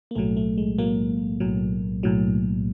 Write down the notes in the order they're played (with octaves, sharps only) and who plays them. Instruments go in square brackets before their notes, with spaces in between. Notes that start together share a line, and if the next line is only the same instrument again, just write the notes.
[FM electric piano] A#3
B1 A2 F#3 A3
A3
G#3
B1 A2 F#3 A#3
B1 A2 F#3
B1 A2 F#3